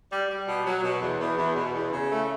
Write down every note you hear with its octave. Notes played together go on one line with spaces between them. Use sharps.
G3
G3
B2
F#3
B2
E2
E2
E2
B2
E2
C#3
A3